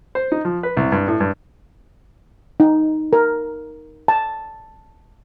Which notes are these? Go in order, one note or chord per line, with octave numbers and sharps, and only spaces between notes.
C5
D#4
F3
B4
C2
G2
A2
G2
D#4
A#4
A5